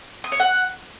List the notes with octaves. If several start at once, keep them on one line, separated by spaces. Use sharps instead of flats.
D#6
C#5
F#5